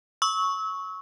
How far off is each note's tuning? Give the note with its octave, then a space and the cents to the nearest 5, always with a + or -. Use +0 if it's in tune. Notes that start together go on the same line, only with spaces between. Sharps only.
C#6 +0 E6 -30